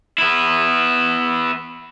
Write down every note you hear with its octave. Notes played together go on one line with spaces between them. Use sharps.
B3 E4